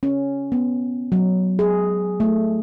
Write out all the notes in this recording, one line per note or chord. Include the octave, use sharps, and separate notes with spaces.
C#4
B3
F#3
G#4
A3